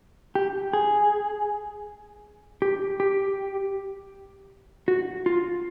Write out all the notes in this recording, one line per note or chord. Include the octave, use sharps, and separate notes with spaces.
G4
G#4
G4
G4
F#4
F4